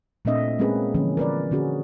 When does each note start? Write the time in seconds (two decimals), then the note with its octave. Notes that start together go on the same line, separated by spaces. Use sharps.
0.25 A#2 A3 C4 D4 D#5 E5
0.59 G#3 A#3 C4 C#4 G#4 B4
0.94 D3 E3 F3 A#3 C#4
1.17 A#4 B4 D5
1.51 D3 C#4 F#4 G#4